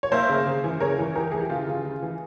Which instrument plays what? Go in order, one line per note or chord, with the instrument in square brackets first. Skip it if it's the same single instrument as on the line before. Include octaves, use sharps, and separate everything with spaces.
[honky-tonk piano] C#5
A#3 C5 E5
C#3
C#3
E3
C#3 A#4 C#5
E3
E3 G4 A#4
E3 G#4
G4
C#3 F4
C#3
C#3
E3